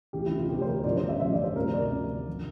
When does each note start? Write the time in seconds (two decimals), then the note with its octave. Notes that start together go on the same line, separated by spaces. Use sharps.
0.13 D2 C3 E3 G4
0.26 E4
0.37 F4
0.49 D2 C3 E3 G4
0.62 C5
0.66 A#4
0.84 A1 G2 D3 F3 D5
0.97 C5
1.09 E5
1.20 A1 G2 D3 F3 E5
1.33 D5
1.44 C5
1.56 D2 C3 F3 A#4
1.74 D5
1.92 D2 C3 F3
2.28 D3